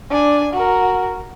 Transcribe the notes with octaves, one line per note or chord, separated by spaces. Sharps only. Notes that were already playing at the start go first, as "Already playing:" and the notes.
D4 G#5
F#4 A#4